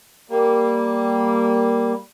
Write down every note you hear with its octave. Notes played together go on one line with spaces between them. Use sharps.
G3 A#3